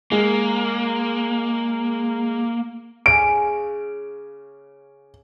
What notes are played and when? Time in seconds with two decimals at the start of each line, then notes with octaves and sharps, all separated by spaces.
0.12 G#3 A#3
3.06 C#3 D7